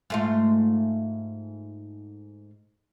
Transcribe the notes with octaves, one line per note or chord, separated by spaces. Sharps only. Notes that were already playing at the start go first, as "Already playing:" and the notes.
G#2 A3 F4